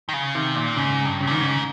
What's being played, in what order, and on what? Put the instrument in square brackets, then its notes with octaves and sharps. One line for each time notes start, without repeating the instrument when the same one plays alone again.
[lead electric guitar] D#3
C#3
[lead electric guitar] C3 [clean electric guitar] D#3
[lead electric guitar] A#2
[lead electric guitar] G#2 [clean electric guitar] C#3
[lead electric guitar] G2
[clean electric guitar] C#3
[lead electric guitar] A#2
[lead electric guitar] G#2 [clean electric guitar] D#3
[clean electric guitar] C#3